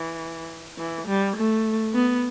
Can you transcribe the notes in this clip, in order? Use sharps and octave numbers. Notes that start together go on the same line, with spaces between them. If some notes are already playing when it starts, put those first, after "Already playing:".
Already playing: E3
E3
G3
A3
B3